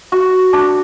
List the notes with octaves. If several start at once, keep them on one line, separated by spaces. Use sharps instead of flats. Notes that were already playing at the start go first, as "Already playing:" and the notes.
F#4
D4